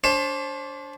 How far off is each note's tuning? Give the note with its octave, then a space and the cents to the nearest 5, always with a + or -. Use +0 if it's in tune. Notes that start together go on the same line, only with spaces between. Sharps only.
D4 -25 C5 +30